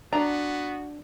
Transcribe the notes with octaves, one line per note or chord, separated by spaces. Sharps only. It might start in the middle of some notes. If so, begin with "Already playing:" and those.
B3 D4 F#4 A#5